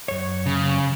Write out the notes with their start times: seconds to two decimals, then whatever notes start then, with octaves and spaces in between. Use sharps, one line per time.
0.08 F#2 C#5
0.46 C#3